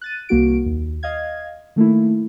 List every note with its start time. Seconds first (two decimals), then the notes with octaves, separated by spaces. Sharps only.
0.01 F#6 A6 D#7
0.29 C2 A#3 F#4 D7
0.66 D#2
1.03 D#5 F5 G#6
1.76 D#3 A3 A#3 E4